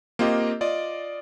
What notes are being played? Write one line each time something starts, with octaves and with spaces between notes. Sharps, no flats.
A#3 C4 F4 G4 D#5
F4 D5 D#5